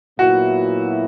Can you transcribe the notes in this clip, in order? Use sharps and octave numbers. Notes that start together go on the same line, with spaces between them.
A#2 F#3 B3 E4 F#4